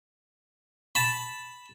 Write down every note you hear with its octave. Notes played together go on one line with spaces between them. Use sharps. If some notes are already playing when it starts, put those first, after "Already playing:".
A5 B5